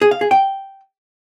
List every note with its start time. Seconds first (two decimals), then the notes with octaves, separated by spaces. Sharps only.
0.01 G#4
0.11 F5
0.21 G#4
0.31 G5